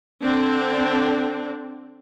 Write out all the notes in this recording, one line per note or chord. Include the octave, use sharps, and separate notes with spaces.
D3 C4 D4